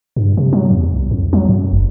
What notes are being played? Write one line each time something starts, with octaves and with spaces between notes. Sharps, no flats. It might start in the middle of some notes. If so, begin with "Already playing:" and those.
G2
C3
F#3
E2
C2
F2
F#3
F#2
F#1